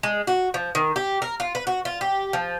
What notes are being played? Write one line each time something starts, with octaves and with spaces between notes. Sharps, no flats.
G#3
F#4
F3
D#3
G4
A#4
F4
B4
F#4
F4
G4
F3